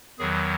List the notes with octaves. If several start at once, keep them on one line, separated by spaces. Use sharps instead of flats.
E2 D#3 F#3 G#4